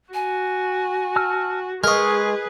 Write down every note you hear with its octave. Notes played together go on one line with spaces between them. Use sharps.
F#4 G#5
A5 E6 F6
G#3 G#4 A#4 B4 D#5 C#6